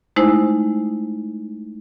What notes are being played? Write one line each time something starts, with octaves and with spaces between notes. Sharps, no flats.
G#3 A3 D#4 E4 C5